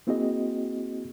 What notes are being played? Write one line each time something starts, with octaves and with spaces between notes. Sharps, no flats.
A#3 C4 E4 F#4 G#4 D#5